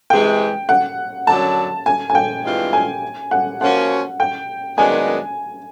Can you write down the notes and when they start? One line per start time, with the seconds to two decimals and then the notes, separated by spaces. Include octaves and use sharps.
0.10 C3 E3 G#3 G5
0.69 F#5
1.27 F#2 D3 F#3 A5
1.86 G#5
2.10 G#5
2.15 G5
2.44 G2 E3 G#3 C4 F4
2.73 G#5
3.31 F#5
3.61 F3 A#3 C#4 F#4 F#5
4.20 G5
4.77 F#2 D#3 G#3 B3 D4 G#5